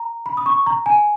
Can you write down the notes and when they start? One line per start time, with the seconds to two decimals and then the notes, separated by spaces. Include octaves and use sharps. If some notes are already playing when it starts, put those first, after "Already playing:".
Already playing: A#5
0.26 B5
0.37 D#6
0.46 C#6
0.66 A#5
0.86 G#5